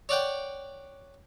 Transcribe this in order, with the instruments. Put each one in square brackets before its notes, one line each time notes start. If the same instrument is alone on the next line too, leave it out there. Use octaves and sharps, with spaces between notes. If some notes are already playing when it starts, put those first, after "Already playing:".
[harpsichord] C#5 D5 F#5 G5